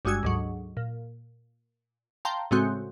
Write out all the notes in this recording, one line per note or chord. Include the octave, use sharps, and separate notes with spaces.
G1 G2 G#3 F#4 E6 G#6
D2 G#2 F#3
A#2
F5 G5 A5 A#5 C6
A2 C#3 G#3 C4 F#4